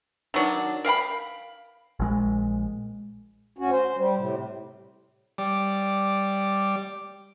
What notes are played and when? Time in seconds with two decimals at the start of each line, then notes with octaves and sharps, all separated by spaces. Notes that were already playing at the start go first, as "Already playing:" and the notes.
0.34 D#3 F#3 D4
0.84 A#4 F5 G5 B5
2.00 A#1 G#3
3.58 D2 C#4 F#4
3.71 C5
3.97 G3
4.16 A2 C3
5.38 G3 D5